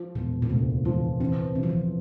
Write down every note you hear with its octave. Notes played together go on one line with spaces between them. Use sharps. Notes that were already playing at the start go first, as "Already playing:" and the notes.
Already playing: F3
E1 A#2
A#2
D2 C3
E3 F3
E3 C4
C3 E3
F3
E3